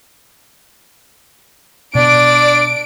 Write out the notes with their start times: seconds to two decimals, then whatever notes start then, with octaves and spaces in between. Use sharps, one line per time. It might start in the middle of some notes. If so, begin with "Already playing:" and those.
1.95 B2 B3 D4 D5 D7